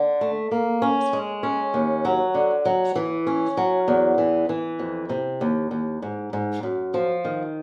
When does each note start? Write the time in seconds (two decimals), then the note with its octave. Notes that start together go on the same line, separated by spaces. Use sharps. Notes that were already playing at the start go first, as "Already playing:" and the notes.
Already playing: D3
0.21 A3
0.51 A#3
0.82 C#4
1.13 G#3
1.43 C#4
1.74 D#2
2.05 F#3
2.35 D3
2.65 F#3
2.95 E3
3.27 C#4
3.57 F#3
3.88 E2
4.18 E3
4.49 E3
4.79 F2
5.09 C3
5.41 D#2
5.71 D#2
6.02 G#2
6.33 G#2
6.63 F#2
6.94 F3
7.25 D#3